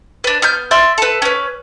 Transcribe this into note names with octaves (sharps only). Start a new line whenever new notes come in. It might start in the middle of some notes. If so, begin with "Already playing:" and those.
D4 B4
B3 F6 G6
D5 E5 C6
A4 B4
C#4 B4